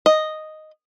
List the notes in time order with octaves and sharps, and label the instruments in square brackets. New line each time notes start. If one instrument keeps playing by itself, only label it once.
[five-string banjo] D#5